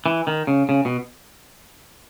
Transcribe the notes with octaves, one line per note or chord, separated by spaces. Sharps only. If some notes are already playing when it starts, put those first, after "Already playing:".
E3
D#3
C#3
C#3
B2